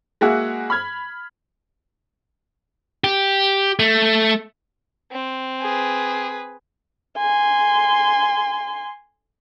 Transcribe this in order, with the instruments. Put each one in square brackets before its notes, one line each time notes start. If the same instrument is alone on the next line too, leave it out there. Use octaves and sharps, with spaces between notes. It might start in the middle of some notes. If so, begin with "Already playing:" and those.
[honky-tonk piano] G#3 A#3 F#4 G#4 E5 F#5
B5 F6 G#6
[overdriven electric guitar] G4
A3
[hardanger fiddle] C4
[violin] G#4 B4
[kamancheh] G#5 C6